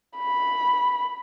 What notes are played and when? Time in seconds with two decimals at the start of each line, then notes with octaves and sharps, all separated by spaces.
0.17 B5